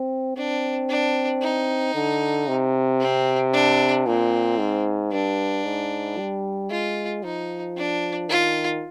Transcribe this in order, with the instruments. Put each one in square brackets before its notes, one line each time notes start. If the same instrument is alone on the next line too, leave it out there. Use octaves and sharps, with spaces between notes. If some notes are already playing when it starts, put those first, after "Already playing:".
Already playing: [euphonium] C4
[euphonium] C4 [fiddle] D4
[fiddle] D4
D#4
[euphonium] D3
C3
[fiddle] C4
D4
[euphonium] A#2 [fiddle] C4
[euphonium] G#2
[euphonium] G2 [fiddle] D4
[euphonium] G#2
G3
[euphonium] G#3 [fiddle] F4
[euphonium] F3 [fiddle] D#4
[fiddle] D4
[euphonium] D#3 [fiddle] F4